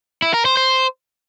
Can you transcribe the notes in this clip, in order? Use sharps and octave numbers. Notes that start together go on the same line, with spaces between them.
E4
A#4
C5
C5